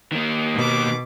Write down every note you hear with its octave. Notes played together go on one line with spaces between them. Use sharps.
D#3 A#3
B2 D6